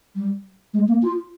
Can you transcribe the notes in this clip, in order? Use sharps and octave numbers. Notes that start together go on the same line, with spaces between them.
G3
G#3
A#3
F4